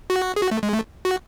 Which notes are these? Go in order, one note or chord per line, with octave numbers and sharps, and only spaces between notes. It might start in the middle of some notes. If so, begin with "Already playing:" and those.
F#4
G#4
F#4
A3
G#3
A3
F#4